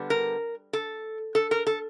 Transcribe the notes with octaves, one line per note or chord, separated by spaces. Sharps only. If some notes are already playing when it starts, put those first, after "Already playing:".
Already playing: D3 G3 B3 D4
A#4
A4
A4
A#4
A4